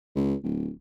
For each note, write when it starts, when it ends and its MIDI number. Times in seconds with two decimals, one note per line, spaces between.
0.15 0.34 37
0.44 0.70 26